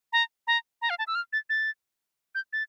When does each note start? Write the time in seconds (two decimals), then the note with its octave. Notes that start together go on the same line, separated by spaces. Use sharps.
0.13 A#5
0.47 A#5
0.82 A#5
0.90 F5
0.99 A5
1.07 E6
1.15 F6
1.33 A6
1.50 A6
2.35 G6
2.53 A6